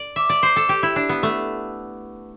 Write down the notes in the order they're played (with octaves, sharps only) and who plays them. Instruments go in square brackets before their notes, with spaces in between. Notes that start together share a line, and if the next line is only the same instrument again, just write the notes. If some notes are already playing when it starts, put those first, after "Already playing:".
Already playing: [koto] D5
[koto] E5 [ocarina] D6
[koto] D5
C5
A4
G4
E4
D4
B3
A3